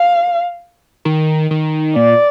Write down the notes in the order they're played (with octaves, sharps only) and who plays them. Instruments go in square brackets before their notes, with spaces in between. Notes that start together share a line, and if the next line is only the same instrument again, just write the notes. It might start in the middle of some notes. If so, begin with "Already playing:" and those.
Already playing: [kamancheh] F5
[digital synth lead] D#3
D#3
[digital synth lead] A#2 [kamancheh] D5